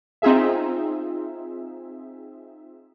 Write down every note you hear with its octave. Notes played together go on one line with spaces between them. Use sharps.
C4 D#4 F4 G#4 E5